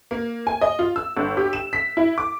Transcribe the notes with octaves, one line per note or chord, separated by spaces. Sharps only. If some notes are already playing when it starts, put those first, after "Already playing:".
A#3
G#5
D#5
F4
E6
G1
G4
E7
B6
E4
D6